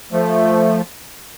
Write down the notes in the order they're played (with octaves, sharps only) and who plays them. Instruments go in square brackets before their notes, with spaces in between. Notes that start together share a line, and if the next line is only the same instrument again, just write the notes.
[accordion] F3 A3